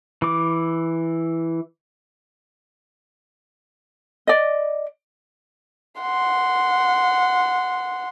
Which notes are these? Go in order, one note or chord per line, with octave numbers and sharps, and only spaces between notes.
E3 D6
D5 D#5
F#5 C6